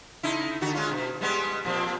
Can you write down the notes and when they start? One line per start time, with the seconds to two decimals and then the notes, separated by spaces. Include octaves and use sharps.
0.23 C#3 D#4 E4
0.61 D3 F#4
0.74 G#3 C#4 F4
0.91 B2
1.21 G3 G#3 B3
1.65 A#2 F3 C4